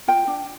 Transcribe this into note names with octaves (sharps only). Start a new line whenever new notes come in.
F4 G5
D4